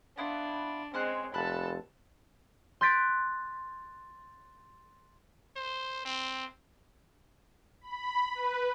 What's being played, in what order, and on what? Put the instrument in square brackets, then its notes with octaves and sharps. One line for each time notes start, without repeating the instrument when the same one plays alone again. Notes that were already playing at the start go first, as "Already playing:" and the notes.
[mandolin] B3 E4 F4 [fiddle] D4
[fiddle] G#3 C4 [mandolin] C#4 C5 F#6
[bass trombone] F1 [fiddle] A4 A5 [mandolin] B5 F#6
[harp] C6 F#6 G6 A6 B6 D7
[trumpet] C5
C4
[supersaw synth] B5
B4